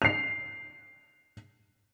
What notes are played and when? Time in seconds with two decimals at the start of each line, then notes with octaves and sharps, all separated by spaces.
0.02 C7 F7